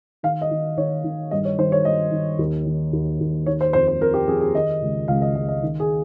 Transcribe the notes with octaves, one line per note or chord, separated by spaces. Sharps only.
D#3 F5
D#5
D#3
D#3 C#5
D#3
G2 D#5
C#5
D#3 C5
C#5
G2 D#5
D#3
D#2
D#3
D#2
D#2
D#3 C#5
C5
F2 C5
C5
F2 A#4
G4
F2 G#4
G#4
D#3 D#5
C#2
C#2 F5
D#5
C#2 D#5
D#5
D#3
G#4